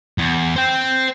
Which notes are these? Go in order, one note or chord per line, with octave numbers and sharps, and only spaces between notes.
E2
C5 G5